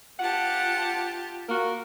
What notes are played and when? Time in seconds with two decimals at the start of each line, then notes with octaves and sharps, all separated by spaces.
0.20 F4 G4 F#5 A5
1.49 A#3 F#4 A#4